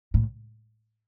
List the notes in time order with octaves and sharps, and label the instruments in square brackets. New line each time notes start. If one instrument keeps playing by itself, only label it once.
[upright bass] A2